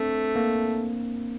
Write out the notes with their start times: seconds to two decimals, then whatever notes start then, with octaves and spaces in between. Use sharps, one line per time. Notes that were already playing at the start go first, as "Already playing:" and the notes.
Already playing: A3 C4 D4
0.36 A#3